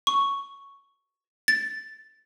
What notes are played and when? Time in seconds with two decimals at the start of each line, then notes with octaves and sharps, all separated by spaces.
0.07 C#6
1.48 A6